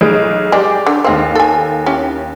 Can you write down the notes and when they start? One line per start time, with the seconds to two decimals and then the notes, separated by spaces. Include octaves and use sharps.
0.01 B1 G#4 D7
0.52 G#3 G4 D5 D6
0.86 D3
1.04 D#2 G#3 C4 F5
1.35 A4 G#5
1.86 C#4 E4 G4